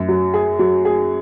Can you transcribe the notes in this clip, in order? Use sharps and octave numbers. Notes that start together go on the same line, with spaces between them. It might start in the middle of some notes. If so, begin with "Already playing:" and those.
Already playing: F#2
F#3
G#4
F#3
G#4